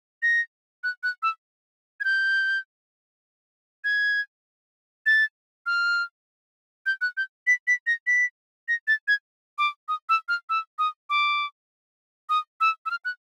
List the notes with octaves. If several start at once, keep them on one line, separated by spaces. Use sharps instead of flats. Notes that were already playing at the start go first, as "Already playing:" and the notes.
A#6
F#6
F#6
E6
G#6
G6
G#6
A6
F6
G6
F#6
G6
B6
B6
A#6
B6
A#6
A6
G#6
D6
D#6
E6
F6
E6
D#6
D6
D#6
E6
E6
F6
F#6